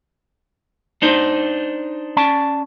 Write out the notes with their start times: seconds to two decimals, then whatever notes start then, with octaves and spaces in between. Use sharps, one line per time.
1.02 D4 D#4 C5
2.17 C#4 D5 A5